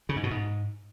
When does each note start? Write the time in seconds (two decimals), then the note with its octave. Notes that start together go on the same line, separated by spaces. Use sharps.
0.09 C#3
0.16 G#2
0.23 B2
0.31 G#2